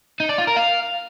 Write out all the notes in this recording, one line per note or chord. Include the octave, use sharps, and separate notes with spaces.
D#4
D5
F4
A#4
F5